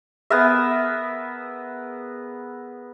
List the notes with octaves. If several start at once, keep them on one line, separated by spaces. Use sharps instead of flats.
B3 G#4 A#4 E5